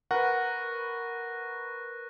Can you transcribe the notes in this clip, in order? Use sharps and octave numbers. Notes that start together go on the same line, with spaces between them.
A#4 B4 F#5 C#6 F#6 A#6